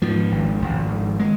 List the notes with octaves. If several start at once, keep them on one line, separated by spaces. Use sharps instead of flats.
G#2 F3
G#1
G#1
G#2
G#3